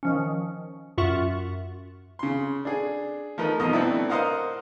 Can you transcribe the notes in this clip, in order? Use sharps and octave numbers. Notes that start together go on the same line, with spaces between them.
D#3 F3 C#4
F#2 F4 E5 F#5 C#6
C#3 C6
D4 G#4
F3 A3 D#4 A#4 B4
C2 B2 F3 D#4 D#5 A#5
A3 B3 C4 D4 E4
A#4 C5 D#5 F5 F#5 A#5